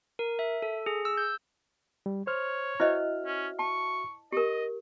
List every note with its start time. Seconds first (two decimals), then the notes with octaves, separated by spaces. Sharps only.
0.19 A#4
0.39 E5
0.62 A4
0.86 G#4
1.05 E6
1.17 G6
2.06 G3
2.27 C5 C#5 F6
2.80 E4 F#4 C5 D#5 E5 F6
3.26 C#4
3.59 A5 C#6
4.32 G4 A#4 D#5